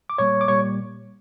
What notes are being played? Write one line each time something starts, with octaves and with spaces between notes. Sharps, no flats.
D6
A#2 G3 A#3 C#5 C#6
D6
A#2 G3 A#3 C#5 C#6